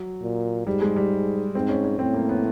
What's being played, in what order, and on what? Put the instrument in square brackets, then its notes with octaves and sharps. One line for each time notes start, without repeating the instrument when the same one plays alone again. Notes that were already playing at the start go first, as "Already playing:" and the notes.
Already playing: [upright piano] F#3
[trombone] A#2
[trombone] G#2 [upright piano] G3
[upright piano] G#3
G3
[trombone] G#2 [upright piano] C4
[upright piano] C#4
C#4
[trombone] A2 [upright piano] C4
[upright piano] A#3
B3